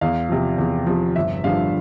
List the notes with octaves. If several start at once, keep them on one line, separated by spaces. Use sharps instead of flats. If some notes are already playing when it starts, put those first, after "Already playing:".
E2 F5
C3 F3
E2
C3 F3
G1 E5
G2 D3 F3 F5